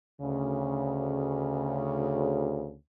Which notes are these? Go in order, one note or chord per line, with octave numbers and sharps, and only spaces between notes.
D2 C#3